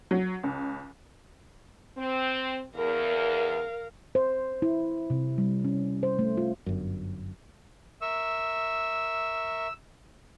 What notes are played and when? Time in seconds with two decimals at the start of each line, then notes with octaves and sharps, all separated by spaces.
0.11 F#3
0.43 C#2
1.97 C4
2.75 E2 A#4 F5
4.15 C5
4.62 E4
5.10 C3
5.38 G3
5.64 C#4
6.03 C5
6.19 A3
6.37 F4
6.66 G1 F#2
8.01 A#4 E5 C#6 E6